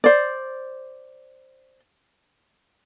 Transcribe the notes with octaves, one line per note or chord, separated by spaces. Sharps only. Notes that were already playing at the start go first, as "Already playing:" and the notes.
C5 D5